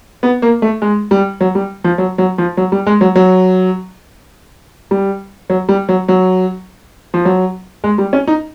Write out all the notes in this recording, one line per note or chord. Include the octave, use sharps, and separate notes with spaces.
B3
A#3
A3
G#3
G3
F#3
G3
F3
F#3
F#3
F3
F#3
G3
G#3
F#3
F#3
G3
F#3
G3
F#3
F#3
F3
F#3
G#3
G3
C#4
D#4